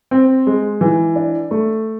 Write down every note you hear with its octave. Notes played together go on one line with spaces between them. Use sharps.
C4
G#3
E3
D4
A3